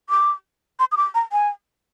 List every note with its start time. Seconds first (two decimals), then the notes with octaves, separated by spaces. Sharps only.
0.10 D6
0.79 C6
0.92 D#6
0.97 D6
1.15 A#5
1.32 G#5